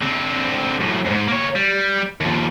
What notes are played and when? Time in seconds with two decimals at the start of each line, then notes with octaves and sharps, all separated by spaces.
0.01 D3 C4
0.81 F#2 A2
1.06 F2 G#2
1.28 A#3 C#5
1.56 G3
2.21 D#2 F3